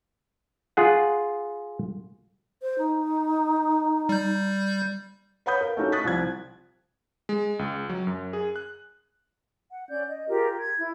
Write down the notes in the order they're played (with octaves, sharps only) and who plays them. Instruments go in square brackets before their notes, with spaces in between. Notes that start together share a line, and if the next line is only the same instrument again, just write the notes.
[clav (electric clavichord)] F4 G#4 F#5
[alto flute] C5
D#4
[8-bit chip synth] G3 G6
[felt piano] B4 C#5 F#5 B5 D#6 G6
A#4 F5
A3 C#4 D#4 F#4 G4
C#6 D#6 F#6 A6 B6
C2 F3 C4 G#6
[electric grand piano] G#3
C#2
F#3
F#2
G#4
F#6
[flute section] F#5
C#4 D5 G6
D#5
F4 G4 G#4 A#4
G#6
E4